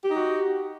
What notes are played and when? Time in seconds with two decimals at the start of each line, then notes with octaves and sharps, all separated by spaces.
0.04 G4
0.08 D#4
0.13 F#4